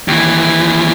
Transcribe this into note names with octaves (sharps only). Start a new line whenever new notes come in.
D#2 E3